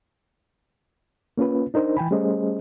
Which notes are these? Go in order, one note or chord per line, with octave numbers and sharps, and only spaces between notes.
A#3 C#4 F4 B4
D4 D#4 A#4 C5
E3 G5 G#5 B5
G3 A3 C#4 G#4 C5 D#5